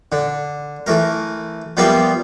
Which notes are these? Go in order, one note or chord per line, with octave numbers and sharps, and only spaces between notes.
D3
E3 A3 A#4
F3 G3 A#3 B3 F4 E5